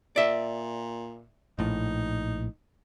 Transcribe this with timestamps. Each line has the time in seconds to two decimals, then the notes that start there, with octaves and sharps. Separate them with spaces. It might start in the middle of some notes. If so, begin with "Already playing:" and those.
0.16 A#2 D5 E5
1.59 A#1 A2 D#4